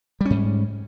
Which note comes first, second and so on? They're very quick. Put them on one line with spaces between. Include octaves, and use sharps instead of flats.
G3 C#4 G#2